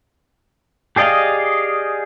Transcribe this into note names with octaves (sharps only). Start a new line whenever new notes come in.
G4 G#4 D5 D#5 F5